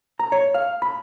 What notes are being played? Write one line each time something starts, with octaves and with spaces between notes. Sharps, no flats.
A#5
C#5
F5
B5